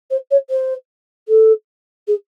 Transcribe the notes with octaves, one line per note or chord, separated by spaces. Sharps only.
C5
C#5
C5
A4
G#4